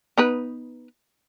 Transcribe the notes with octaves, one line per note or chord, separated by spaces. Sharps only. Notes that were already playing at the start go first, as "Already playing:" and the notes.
B3 D#4 B4